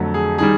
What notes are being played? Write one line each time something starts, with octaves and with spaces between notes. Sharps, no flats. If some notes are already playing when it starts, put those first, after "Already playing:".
Already playing: F2 D3 F#3 A3
G#4
D#3 G3 G#4